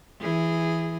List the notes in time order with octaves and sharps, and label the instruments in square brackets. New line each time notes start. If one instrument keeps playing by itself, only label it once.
[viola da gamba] E3 G#4